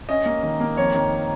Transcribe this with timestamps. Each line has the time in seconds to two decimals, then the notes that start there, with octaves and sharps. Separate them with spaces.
0.09 C#4 D#5
0.26 A#3
0.43 D#3
0.60 A#3
0.77 F2 C#5
0.94 D#3